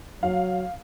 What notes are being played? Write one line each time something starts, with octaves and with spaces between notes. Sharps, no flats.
F#3 F5